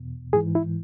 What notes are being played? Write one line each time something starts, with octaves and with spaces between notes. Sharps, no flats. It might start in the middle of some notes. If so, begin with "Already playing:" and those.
Already playing: E2 B2
G#2 E3 G#4
E4